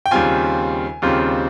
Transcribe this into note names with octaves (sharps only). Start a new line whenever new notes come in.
G5
D#2 C#3 G3 C4 F4 G#5
D#2 C#3 G3 C4 F4